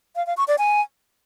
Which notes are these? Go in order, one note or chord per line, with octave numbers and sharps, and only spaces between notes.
F5
F5
C#6
D5
G#5